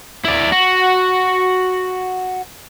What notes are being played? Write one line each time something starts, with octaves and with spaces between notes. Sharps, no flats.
E4 D5
F#4